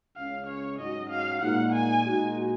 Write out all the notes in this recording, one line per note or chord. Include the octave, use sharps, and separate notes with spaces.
C#2 C#3 G#3 C#4 F5
C#5
G#2 F#3 C#4 F#4 D#5
F5
A#2 G#3 D#4 F#5
G#5
A#2 G#3 D#4 F#4